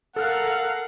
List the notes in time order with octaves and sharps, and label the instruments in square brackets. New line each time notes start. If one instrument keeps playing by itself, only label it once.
[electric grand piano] A4 F6 F#6 [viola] A#4 F5 [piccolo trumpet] F#5